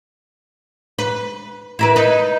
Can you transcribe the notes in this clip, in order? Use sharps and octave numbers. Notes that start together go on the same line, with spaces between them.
B4
E4 A#4 B4
D#4 B4